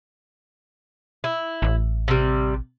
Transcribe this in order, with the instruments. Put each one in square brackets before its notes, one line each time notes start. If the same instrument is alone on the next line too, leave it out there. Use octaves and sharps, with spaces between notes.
[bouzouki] E4
[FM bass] A1
[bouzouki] C3 G3